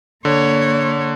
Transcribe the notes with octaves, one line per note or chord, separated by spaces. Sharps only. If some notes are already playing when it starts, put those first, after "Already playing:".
D3 A#3 C#5